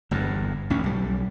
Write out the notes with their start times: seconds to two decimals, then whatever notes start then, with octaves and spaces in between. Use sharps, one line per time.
0.11 G1 E2 G2
0.70 A1 D2 C#4
0.84 B1 G3